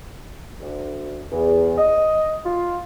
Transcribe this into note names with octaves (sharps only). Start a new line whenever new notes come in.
D2
E2
D#5
F4